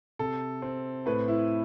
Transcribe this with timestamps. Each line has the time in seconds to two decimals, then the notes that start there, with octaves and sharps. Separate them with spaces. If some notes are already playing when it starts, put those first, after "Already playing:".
0.19 C3 A4
0.62 C4
1.06 A2 B4
1.28 E4